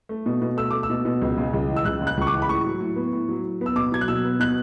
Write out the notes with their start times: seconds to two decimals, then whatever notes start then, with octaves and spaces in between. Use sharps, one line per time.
0.09 A3
0.26 B2
0.42 B2
0.57 A3 E6
0.71 A3 D6
0.83 E6
0.90 B2
1.05 B2
1.22 C#2
1.38 C#3
1.54 C#2
1.68 E3
1.76 E6
1.84 C#2 F#6
2.01 C#3
2.07 F#6
2.17 C#2 C#6
2.27 D6
2.32 E3
2.42 B5
2.48 A2 C#6
2.64 F#3
2.81 A2
2.96 B3
3.13 A2
3.29 F#3
3.44 A2
3.61 B3 E6
3.76 B2 D6
3.92 F#3 G#6
4.01 F#6
4.08 B2 E6
4.24 B3
4.40 B2 F#6